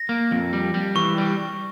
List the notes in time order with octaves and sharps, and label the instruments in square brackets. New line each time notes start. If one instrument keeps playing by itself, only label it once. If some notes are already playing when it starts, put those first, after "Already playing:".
Already playing: [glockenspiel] A#6
[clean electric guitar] A#3
F2
G3
G3
[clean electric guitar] E3 [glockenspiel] C#6
[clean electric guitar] G3